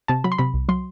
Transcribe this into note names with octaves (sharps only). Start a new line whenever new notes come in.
C3 A5
F#3 B5
C6
C3 B5
C2
F#3 C6